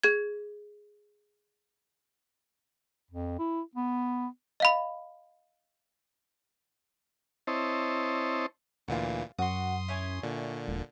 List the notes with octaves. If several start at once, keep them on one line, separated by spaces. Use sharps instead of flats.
G#4 G#6
F2
E4
B3
D#5 F5 B5
C4 E4 C5 C#5 D#5 A5
D2 A#2 E3 F4 F#4
F#2 F#4 C6 D#6
E4 C#5 G#5
A#2 D3
E1